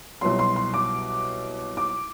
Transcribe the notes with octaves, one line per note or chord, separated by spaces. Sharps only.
C2 B2 F#3 C6
C6
C6
D6
D6